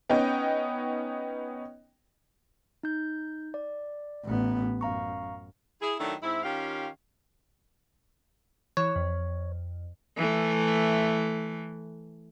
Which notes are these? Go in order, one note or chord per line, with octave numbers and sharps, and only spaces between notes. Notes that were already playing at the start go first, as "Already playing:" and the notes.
B3 C#4 D#4 D#5 G5
D#4 G6
D5
A1 B3
F#2 F5 A#5 C#6
E4 G#4
D#3 F#3 A3 D4 E4
G#2 C4 E4
D#3 C#4 F4 G4 F5
E3 C#5
F2
E3 A3